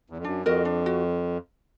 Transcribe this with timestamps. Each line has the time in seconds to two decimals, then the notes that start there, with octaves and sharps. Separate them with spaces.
0.10 E2
0.17 F2
0.24 F#2 D4
0.46 F2 F#4 A#4 D#5
0.65 D4
0.86 F#4